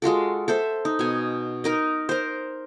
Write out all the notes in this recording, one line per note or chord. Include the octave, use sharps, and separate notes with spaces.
G#3 F4 F#4 A4
A4 C5 E5
D#4
B2 G#5
D#4 A#4 D#5
A#4 C5